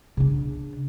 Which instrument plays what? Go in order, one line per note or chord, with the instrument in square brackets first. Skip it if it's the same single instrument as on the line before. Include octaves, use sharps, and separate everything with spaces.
[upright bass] C#3 D4